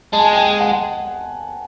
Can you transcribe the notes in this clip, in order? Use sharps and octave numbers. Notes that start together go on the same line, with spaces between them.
G#3 A5
G#5
A5
G5
G#5
G5
F#5